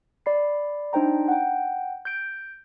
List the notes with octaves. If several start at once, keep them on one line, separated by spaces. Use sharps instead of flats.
D5 B5 C7
D4 D#4 C5 G5 A#5
F#5 G5
G6 D7